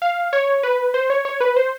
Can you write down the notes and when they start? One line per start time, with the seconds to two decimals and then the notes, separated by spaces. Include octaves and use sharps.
0.02 F5
0.33 C#5
0.63 B4
0.94 C5
1.10 C#5
1.25 C#5
1.40 B4
1.56 C5